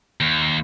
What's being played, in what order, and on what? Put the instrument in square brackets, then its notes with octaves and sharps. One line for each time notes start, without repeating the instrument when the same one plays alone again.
[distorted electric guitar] D#2